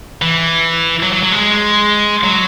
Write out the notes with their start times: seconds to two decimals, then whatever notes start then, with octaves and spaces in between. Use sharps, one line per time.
0.22 E3
1.03 F#3
1.13 F#3
1.23 F#3
1.32 G#3
2.24 F#3